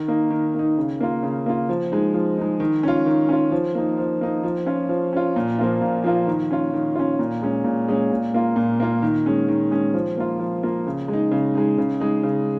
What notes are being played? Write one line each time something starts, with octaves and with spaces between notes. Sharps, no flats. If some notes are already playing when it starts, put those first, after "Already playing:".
Already playing: D#3
A#3 D#4
D#3
A#3 D#4
C#3
A#3 F4
C#3
A#3 F4
F3
G#3 D#4
F3
G#3 D#4
D#3
C#4 F4
D#3
C#4 F4
F3
A#3 D#4
F3
A#3 D#4
F3
C#4 F4
F3
C#4 F4
A#2
F3 A#3 F4
A#2
F3 A#3 F4
D#3
C#4 F4
D#3
C#4 F4
A#2
G#3 C#4
A#2
G#3 C#4
A#2
A#3 F4
A#2
A#3 F4
D#3
G#3 C#4
D#3
G#3 C#4
F3
A#3 F4
F3
A#3 F4
C#3
G#3
D#4
C#3
G#3 D#4
C#3
G#3 D#4
C#3